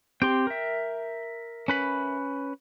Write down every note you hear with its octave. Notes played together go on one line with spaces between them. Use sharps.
C4 G4 G5 C6
A#4 E5
C#4 B4 B5